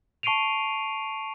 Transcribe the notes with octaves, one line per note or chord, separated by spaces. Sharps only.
A5 C#6 C7 D7 D#7 F7